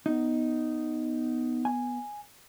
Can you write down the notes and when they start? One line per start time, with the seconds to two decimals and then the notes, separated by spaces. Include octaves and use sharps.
0.06 B3 D#4
1.65 G#5